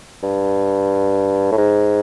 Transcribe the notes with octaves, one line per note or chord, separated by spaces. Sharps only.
G2
A2
G#2